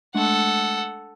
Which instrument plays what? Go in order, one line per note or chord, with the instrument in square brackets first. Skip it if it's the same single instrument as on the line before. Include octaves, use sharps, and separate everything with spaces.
[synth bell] G#3 A3 D4 [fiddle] A4 F#5